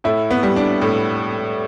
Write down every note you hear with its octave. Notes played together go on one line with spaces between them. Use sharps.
A2 E4
B3
G3
D4
A2